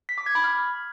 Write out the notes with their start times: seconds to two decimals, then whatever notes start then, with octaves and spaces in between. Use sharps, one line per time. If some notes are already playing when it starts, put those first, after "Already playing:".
0.09 B6
0.18 D6
0.26 G#6
0.35 B5
0.44 F6